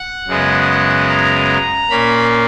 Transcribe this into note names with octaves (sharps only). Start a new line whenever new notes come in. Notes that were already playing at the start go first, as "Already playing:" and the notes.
Already playing: F#5
F#2 C#3 G#3 B3
A#5
A#2 A#3 C#4 B5